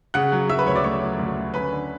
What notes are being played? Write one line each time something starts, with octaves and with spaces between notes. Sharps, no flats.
C#3 F#5 F#6
F#3
F#3 E5 E6
B4 B5
D2 C#5 C#6
D5 D6
A3 C#5 C#6
F#3
D2
A3
C#4 B4 B5
D3